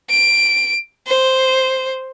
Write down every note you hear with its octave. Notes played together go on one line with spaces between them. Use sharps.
D7
C5